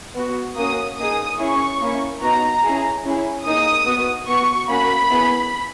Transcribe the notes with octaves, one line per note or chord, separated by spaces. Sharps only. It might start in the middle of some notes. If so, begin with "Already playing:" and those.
B3 F#4
A#3 C#4 F#4 D#6
A#3 D#4 G#4 D#6
C#4 E4 G#4 C#6
A#3 C#4 E4
B3 D#4 F#4 A#5
C#4 E4 G#4
C#4 E4 G#4
A#3 D#4 G#4 D#6
B3 F#4
B3 F#4 C#6
A#3 C#4 F#4 B5
B3 E4 G#4